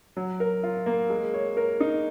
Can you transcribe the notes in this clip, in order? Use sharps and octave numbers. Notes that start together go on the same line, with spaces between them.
F#3
A#4
F4
A#3
G#3
C#5
A#4
D#4